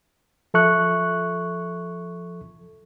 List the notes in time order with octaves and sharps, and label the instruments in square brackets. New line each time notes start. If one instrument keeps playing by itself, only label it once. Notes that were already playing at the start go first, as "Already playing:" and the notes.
[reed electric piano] F3 A4 E5 C#6 F#6